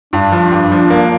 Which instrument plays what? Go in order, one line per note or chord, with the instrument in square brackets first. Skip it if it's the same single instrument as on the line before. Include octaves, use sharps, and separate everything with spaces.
[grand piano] G2 [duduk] D4
[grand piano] F3
G2
F3
A#3